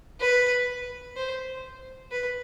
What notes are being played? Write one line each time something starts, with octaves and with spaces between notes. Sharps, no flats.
B4
C5
B4